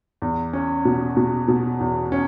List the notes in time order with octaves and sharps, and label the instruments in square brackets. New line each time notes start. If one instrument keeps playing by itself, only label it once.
[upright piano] E2
C#4
B2
B2
B2
E2
C#4